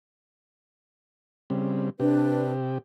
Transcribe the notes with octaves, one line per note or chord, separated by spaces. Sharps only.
C#3 G3 C4
C3 D4 G4 B4